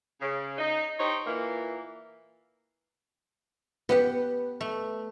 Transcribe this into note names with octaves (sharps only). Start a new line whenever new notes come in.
C#3
D#4
D#4 G4 C5 C#5 D#5
A#2 E3 A#3
B3 G4 B4 F#5
A3